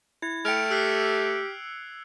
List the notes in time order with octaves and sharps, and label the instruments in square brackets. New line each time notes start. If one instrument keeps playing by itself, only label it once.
[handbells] E4 [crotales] G#6
[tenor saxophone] A3 [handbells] G5 F6 [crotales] C#7 D7 F7
[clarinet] G4 [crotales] E6 F#6 C7